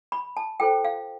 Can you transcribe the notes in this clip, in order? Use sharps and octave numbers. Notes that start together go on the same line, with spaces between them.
B5
A5
F4 A4 C5 G5
F5